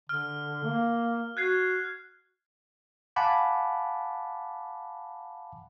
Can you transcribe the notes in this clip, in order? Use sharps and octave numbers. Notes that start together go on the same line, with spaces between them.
D3 F6
A#3
F#4 F#6 G#6 C7
F5 F#5 G#5 A5 B5 D6